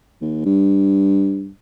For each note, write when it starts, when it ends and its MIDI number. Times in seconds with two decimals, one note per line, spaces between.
0.21 0.45 39
0.45 1.51 43